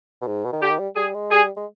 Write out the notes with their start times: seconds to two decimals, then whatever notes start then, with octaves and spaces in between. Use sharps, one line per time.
0.21 B2
0.27 G#2
0.44 B2
0.53 D#3
0.61 D3 G4
0.71 D#3
0.79 G3
0.96 G3 G#4
1.14 G#3
1.31 G3 G#4
1.56 G#3